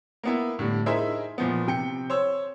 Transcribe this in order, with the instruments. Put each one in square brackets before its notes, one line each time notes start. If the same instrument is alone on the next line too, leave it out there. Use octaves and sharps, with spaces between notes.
[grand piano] A#3 B3 E4
A2 D3 G3
D#4 E4 G#4 A#4 C5 E5
A#2 F3 B3
C3 G5 C#7
C5 C#5 E6